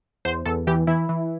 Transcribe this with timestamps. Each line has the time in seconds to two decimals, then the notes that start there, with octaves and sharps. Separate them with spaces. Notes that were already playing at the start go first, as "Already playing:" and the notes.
0.25 E2 C5
0.46 E2 A4
0.67 E3 G4
0.87 E3 E4
1.09 E3